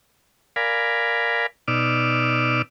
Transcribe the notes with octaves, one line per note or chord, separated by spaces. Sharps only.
A#4 D5 F5 G#5 B5
B2 D#4 D5 D6 E6 F6